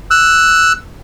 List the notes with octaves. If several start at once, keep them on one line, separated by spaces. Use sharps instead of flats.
E6 F#6